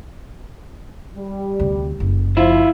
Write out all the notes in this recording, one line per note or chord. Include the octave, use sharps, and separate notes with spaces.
G3
D2 C3
F#1
F3 E4 F4